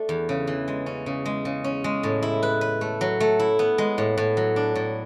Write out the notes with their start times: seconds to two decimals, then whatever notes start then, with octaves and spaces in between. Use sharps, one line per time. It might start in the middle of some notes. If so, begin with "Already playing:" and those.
Already playing: A3 D4
0.09 E2
0.29 C#3
0.47 E3
0.68 G#3
0.86 C#4
1.06 C#3
1.25 G#3
1.45 C#3
1.64 C#4
1.84 G#3
2.03 A2
2.22 E4
2.43 B4
2.61 B4
2.81 A3
3.01 F#3
3.20 A3
3.39 E4
3.59 B3
3.78 G#3
3.98 A2
4.17 A2
4.37 F#3
4.56 D4
4.75 A2